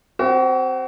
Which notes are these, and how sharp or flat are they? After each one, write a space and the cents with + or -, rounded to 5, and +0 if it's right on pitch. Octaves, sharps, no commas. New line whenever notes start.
C4 +0 F#4 +35